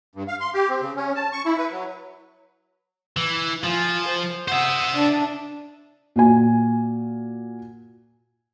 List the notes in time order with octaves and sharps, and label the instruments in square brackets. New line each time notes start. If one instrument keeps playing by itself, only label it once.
[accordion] G2
F5
C6
G4
C4
C#3
C#4
A5
C#6
E4
B4
F#3
[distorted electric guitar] E3
[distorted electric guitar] F3 [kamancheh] F4 G#5
[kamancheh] C5
[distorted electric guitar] C5 E5 [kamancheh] F#5 D#6
[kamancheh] D4 A5
[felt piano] A#2 F#4 G#5